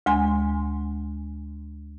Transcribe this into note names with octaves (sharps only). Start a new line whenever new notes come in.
D2 G#3 G#5 C6